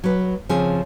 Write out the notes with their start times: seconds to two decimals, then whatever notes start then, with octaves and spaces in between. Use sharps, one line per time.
0.04 F#3 B4
0.49 C#3 F3 C4 G#4